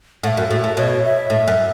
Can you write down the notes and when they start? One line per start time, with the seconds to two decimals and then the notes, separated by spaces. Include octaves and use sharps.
0.23 A2 F#5
0.28 E5
0.37 F#2
0.51 A2
0.64 A2
0.76 B2 C#5
1.03 E5
1.30 A2
1.47 F#2